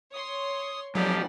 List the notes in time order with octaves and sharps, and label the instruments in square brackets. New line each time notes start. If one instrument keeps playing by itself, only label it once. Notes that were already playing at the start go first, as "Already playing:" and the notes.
[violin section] C#5 C6 [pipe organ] D#6
[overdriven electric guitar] B1 F2 [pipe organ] F3 G4 [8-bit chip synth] F#3 [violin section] D5 F#5